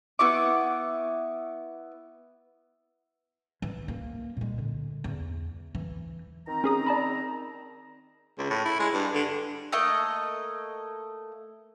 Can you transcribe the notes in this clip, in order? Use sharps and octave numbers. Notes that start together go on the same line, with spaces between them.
B3 E4 C#6 D6
E3
A#3
A#2 G#3
D3
E2
E3
D#3 C4 A#5
C#4 G#4 D#6
D5 A5 B5
C#2
A2
E4
G#3
G2
D3
A3 A#3 D#5 C#6